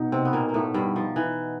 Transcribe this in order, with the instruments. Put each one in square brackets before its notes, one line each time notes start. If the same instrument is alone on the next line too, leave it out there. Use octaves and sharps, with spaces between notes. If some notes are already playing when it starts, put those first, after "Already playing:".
Already playing: [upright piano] B2 D#4
[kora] C3 C4
B3
A#2 A#3
A#3
A2 A3
G2 G3
F3
E3